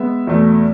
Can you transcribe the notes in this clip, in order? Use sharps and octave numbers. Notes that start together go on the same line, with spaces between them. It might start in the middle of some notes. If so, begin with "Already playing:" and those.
Already playing: G#3 B3 E5
E2 B2 A3